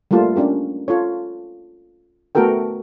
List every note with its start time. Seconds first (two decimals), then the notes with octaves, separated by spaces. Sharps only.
0.11 G3 A3 A#3 F4 A5
0.36 C#4 D4 G4 A#4
0.88 F4 A4 C#5
2.35 A3 B3 F#4 A4 A#4 G5